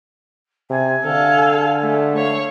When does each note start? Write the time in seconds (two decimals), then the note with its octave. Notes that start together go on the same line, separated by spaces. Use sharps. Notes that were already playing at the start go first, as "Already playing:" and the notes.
0.70 C3 G#5
1.05 D3 A4 F5
1.81 A3
2.16 C#5 F5